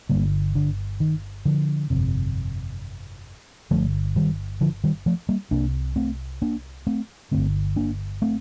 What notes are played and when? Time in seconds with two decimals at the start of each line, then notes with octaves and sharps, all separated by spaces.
0.09 G1 F2 D3 G3 A#3
0.55 D3
1.00 D#3
1.45 D3 F3
1.90 G1 F2 C3
3.71 G1 G2 D3 F3 A3
4.16 D#3 G3
4.61 D3 F3
4.84 D#3 G3
5.06 F3 A3
5.29 G3 A#3
5.51 C2 C3 A#3 D4
5.96 A3 C4
6.42 A#3 D4
6.87 A3 C4
7.31 G1 G2 D3 A3 C4
7.76 A#3 D4
8.22 A3 C4